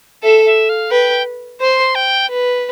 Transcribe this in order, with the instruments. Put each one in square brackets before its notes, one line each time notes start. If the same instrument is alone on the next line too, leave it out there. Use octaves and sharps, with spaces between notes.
[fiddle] A4 [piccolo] E5
[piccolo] E5
F5
[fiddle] B4 [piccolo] G5
[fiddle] C5 [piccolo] C6
[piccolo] G5
[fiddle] B4